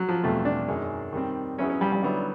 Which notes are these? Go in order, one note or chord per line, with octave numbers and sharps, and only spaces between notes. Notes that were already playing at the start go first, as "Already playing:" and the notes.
Already playing: F#3
F3
E2 B2 G3 A3 C4 F4
D4
F#2 D#3 G#3
D#3 G3 C4
F#3 B3 C#4 E4 G#4
C#4
G3
G3
D3 F#3 G3 B3 E4